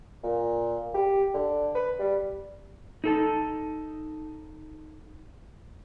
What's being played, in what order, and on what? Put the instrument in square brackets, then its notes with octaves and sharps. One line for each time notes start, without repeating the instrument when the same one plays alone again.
[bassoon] A#2
G4
D3
B4
G3
[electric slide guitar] D#4 A4 A5